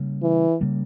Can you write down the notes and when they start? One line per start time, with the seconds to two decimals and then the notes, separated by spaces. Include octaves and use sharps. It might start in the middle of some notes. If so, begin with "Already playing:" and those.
Already playing: C#3 G3 A#3
0.23 E3
0.61 C#3 G3 A#3